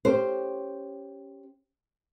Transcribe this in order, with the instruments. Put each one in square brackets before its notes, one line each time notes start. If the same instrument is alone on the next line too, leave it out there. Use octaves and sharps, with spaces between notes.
[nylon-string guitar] C#4 G4 C5